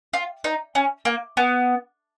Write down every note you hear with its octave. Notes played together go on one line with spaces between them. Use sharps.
F4
D#4
C#4
A#3
B3